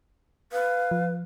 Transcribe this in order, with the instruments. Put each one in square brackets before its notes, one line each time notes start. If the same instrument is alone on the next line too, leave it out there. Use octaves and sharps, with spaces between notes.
[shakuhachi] B4 [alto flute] F5
[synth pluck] F3